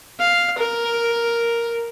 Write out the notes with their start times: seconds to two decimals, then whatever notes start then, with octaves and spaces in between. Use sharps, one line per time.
0.19 F5
0.58 A#4